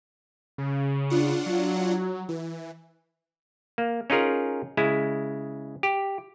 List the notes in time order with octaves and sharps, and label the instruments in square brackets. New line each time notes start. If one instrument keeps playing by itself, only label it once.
[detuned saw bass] C#3
[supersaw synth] D4 F4 F#5
[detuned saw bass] F#3
[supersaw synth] E3
[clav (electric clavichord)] A#3
C#4 D#4 F4 G#4 A#4
C#3 G#3 E4
G4